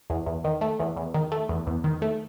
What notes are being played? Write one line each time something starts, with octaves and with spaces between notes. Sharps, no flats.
E2
E2
D#3
A3
E2
E2
D#3
A3
E2
E2
D#3
A3